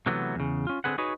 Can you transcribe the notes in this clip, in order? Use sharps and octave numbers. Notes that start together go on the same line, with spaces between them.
C3 E3 F#3 A3 B3
E2 C#3
C#4 F4
D3 C4 G#4 B4 F#5
D#4 F#4 G#4 B4 C#5